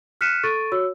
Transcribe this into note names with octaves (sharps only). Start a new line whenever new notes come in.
F6 F#6 B6 C#7 D#7 E7
A4 C#6 A6 D7 D#7
F#4 C#5 E6